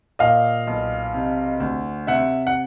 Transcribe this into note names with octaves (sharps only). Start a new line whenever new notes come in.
A#2 D#5 F5
B1
C3
D2
C3 E5 F#5
F#5